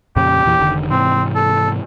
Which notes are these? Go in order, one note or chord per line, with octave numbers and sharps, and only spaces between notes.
F2 A#2 C#3 G4
E2 A#2 E3
F1 D3 D#3
G#2 C3 E3 C4
A4